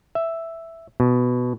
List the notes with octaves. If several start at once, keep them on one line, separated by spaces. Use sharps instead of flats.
E5
B2